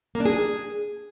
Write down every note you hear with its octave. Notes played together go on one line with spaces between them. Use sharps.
A#3
D4
G#4